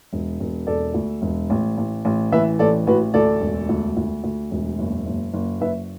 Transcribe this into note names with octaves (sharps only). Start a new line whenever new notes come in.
E1
E1
E1 A4 D5
D2
E1
A1
A1
A1
E3 B4 E5
A1 A4 D5
A1 F#4 B4
D2 A4 D5
E1
D2
D2
D2
E1
F#1
F#1
F#1
F#1 B4 E5